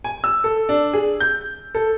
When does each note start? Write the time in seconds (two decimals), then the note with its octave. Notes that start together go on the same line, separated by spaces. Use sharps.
0.04 G#5
0.24 E6
0.44 A4
0.69 D4
0.93 G#4
1.20 G6
1.75 A4